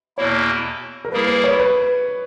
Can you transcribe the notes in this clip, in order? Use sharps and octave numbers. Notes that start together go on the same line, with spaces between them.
E2 B2 A#3 E4 C#5
A#4
G3 A#3 E4 G#4 B4
B4
C#5
B4